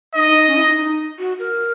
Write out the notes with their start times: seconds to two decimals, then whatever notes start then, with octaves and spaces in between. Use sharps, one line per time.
0.15 D#4 D#5
0.31 D#4
0.47 C#4
0.56 E4
0.61 D#4
0.77 D#4
1.19 F#4
1.39 A#4